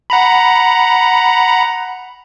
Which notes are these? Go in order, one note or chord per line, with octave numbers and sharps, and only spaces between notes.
F#5 A#5 B5